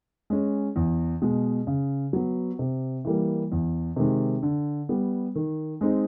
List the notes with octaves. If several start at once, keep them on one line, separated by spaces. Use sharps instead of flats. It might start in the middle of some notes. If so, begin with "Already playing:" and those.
G#3 C#4
E2
B2 G#3
C#3
F#3 B3
C3
E3 G3 A#3
E2
C3 D#3 G#3
D3
G3 B3
D#3
G#3 C4 D#4